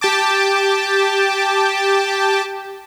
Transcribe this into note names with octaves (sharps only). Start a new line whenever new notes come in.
G4 G5 A5 D6